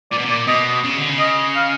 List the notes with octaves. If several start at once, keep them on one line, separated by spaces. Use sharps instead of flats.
A#2 D5
B2
A#2 D5
B2 D#5
C#3
D3
C#3
D#5
F5